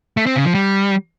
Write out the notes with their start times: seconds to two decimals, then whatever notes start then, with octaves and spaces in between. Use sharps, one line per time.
0.17 A3
0.26 C4
0.36 C#3
0.45 F3
0.55 G3